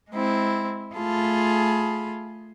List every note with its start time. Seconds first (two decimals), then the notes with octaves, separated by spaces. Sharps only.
0.11 G#3 C4 E4
0.95 A3 F4 G#4 A5 B5